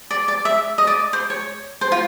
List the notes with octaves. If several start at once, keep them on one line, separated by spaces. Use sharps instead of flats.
D5
D5
E5
D#5
D5
C5
C#5
C5
F4